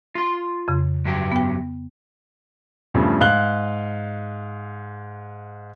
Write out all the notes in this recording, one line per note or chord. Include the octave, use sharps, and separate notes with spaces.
F4 C6
F2 C#3
G2 F#3 G4
B3 G5
E2 G2 C#3 F3 A3
G#2 F5 F#6 G7